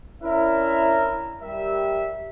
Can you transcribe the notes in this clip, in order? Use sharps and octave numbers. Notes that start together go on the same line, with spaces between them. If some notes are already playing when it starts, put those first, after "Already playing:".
C#4 D4 E4 A#4 E5
G3 G4 A#4 E5